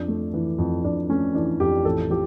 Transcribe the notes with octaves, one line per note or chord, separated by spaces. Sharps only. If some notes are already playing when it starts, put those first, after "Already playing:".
Already playing: F2 D4
A3
E3
F2
F2 D4
A3 C#4
E3 D4
F2 G4
A1 A4
F3 G4